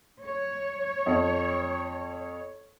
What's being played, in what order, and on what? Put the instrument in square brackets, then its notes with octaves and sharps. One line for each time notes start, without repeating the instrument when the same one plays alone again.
[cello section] C#5
[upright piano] F2